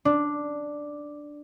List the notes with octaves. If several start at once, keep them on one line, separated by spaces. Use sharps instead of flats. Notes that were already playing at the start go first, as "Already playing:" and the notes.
D4